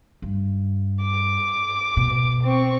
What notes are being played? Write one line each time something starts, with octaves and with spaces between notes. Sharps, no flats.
G2
D6
B2
C4 C#6